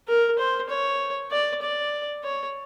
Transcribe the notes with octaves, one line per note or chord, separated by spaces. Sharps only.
A#4
C5
C#5
D5
D5
C#5